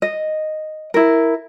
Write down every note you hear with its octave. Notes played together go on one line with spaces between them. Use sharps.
D#5
E4 A#4